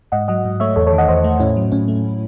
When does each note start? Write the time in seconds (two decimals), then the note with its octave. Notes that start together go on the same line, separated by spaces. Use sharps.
0.12 G#2 D#5 F#5
0.28 F#3 D#5 F#5
0.45 G#2
0.60 A3 C#5 E5
0.76 E2 A4 C#5
0.86 A4 C#5
0.93 D#3
0.98 D#5 F#5
1.08 E2 C5 D#5
1.24 A3
1.40 A2 C#4 E4
1.57 F#3
1.72 A2 C#4
1.88 A3